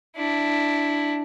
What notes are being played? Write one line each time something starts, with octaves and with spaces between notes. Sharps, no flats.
D4 E4